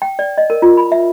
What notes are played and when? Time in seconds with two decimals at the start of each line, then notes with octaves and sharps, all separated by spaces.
0.02 G5
0.19 D5
0.38 D#5
0.50 A#4
0.62 F4
0.77 B5
0.92 E5